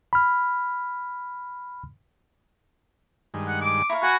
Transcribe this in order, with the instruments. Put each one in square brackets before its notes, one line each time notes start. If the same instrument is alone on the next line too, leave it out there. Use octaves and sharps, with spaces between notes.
[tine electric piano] B5 F6
[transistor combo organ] G2 D#3 G#3
[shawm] F#5
D6
[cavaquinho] E4 F5 [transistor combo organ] A#5 C#6
[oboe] F#4 [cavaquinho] B4 [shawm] G#5